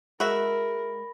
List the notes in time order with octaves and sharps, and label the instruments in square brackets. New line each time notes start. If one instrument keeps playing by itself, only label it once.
[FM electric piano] G#3 [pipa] F#4 E5 [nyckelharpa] A#4 [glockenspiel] B5 A#6